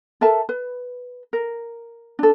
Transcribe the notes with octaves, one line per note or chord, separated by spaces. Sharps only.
A4 A#4 E5 A5
B4
A#4
D4 A4